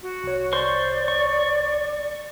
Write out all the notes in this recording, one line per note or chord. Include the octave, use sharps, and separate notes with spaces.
F#4
C2 C#5
C5 D5 C6 C#6
C#6